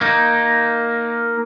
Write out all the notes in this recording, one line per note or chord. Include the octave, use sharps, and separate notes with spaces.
A#3 D#4